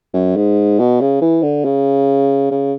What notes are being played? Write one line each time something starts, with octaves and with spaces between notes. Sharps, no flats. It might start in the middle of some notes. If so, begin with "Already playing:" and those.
F#2
G#2
B2
C#3
E3
D3
C#3
C#3